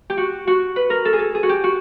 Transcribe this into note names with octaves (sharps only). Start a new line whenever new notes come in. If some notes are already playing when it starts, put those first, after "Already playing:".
G4
F#4
F#4
B4
A#4
A4
G#4
A4
G#4
F#4
G4
F#4